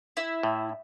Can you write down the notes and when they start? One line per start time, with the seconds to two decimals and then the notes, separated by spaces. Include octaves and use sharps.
0.17 E4
0.43 A2